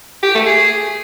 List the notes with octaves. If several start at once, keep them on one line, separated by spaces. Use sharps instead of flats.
G4
A3
G#4